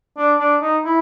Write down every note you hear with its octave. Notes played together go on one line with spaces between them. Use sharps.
D4
D4
D#4
E4